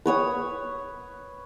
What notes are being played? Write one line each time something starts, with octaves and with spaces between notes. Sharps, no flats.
B4 C#5 D#6